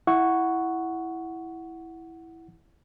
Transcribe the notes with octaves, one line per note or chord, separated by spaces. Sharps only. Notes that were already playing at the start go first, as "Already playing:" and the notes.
E4 F#5 C#6